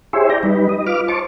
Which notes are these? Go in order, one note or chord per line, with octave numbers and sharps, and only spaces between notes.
E4 G4 G#4 C5 C#5 E5
D5 G5 A#5
G3 D#4 B4
D#5
F4 B4 D6 F6
C5 A5 C#6 D6